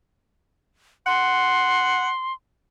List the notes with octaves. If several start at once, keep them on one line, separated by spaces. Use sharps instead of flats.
F#5 C6